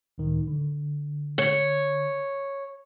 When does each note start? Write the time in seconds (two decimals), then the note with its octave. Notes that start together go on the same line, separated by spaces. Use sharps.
0.18 C#2 A2 D#3
0.47 D3
1.38 C#5